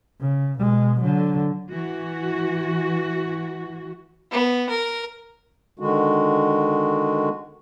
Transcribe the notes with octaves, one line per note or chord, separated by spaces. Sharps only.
C#3
B2 G#3
D3 F#3
E3 F#4
B3
A#4
D3 D#3 G#3 F#4